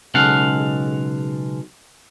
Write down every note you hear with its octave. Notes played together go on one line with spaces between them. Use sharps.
B1 C#3 G#3 A4 F5 F#5